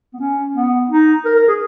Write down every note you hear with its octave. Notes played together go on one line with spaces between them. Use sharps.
B3
C#4
B3
D#4
A#4
A#4
G#4